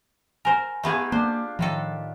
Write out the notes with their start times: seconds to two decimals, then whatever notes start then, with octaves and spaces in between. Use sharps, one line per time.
0.45 A#4 C5 G#5 A#5 C6
0.83 A3 B3 D#4 F4 G4 G#4
1.12 A#3 D4 C5
1.59 A2 D#3 F3 A4